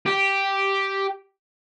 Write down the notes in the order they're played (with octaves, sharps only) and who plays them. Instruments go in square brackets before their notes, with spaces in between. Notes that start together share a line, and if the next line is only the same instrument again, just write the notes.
[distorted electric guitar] G4